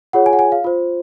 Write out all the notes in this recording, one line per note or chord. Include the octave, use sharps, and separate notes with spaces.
F4 G#4 C#5 F#5
G#5
F#5
G#5
F5
F4 C5